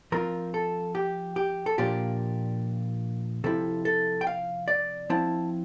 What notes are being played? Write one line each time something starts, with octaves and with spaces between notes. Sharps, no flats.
F3 C4 F4 A#4
A4
G4
G4
A4
A#2 F3 A#3 D4 F4 G4
C3 F3 C4 E4 A4
A4
G5
F5
D5
F3 C4 E4 A5